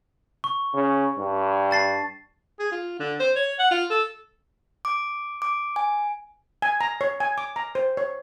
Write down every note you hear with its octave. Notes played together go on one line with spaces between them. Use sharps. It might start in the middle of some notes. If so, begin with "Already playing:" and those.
C#6
C#3
G2
A5 A6 C7
G#4
F4
D3
C5
C#5
F#5
F4
A4
D6
D6
G#5
G#5
A#5
C#5
G#5
D6
A#5
C5
C#5